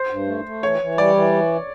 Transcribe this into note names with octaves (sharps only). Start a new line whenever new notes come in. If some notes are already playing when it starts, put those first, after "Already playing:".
Already playing: C5
G2
A3
A3
E3 C#5
E3
G3 D5
E3